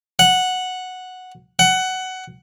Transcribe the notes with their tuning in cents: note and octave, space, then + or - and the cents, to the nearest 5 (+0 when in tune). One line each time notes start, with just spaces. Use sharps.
F#5 -5
F#5 +15